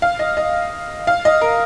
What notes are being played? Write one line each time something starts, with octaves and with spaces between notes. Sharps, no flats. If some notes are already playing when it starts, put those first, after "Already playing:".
F5
D#5
D#5
F5
D#5
A#4